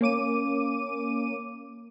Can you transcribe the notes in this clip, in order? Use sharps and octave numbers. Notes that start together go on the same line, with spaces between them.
A#3 C#4 D6 D#7